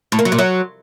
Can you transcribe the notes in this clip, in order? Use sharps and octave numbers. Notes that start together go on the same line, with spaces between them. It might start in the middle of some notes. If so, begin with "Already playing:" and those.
A2
A#3
F#3
A#2
F#3